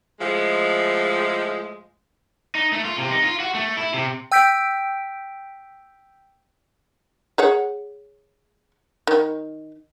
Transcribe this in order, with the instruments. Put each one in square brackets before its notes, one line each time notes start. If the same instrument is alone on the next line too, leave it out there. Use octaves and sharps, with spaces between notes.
[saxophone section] A2 F3 G#3
[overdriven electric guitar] D#4
A3
F4
C3
D#4
F4
F#4
A3
E4
C3
[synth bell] G5 E6 G6 B6 D7
[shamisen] G#4 C#5 F#5
D#3